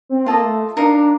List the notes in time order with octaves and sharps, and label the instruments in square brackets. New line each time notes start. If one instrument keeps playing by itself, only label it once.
[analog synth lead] C4
[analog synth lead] A#3 [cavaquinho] F4 A4 D#5
[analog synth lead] A3
[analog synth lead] D4 [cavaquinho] D#4 A#4 F5
[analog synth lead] D4